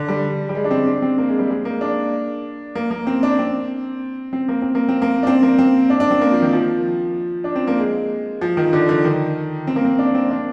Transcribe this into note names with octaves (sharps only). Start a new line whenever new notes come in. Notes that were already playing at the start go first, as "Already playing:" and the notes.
Already playing: D3
G3
G3
G#3
D4
C4
D4
C4
A#3
G#3
G3
G#3
A#3
D4
A#3
A#3
C4
D4
C4
C4
A#3
C4
A#3
C4
A#3
D4
C4
A#3
C4
D4
D4
C4
A#3
F3
D#3
F3
D4
C4
A#3
G#3
F3
D#3
D3
D3
D#3
C4
A#3
C4
D4
C4
D4